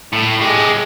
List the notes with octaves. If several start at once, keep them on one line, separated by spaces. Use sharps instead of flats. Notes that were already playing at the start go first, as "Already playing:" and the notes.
A2
G#3 G4